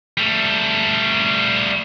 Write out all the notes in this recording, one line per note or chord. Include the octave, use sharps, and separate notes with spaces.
G3 A3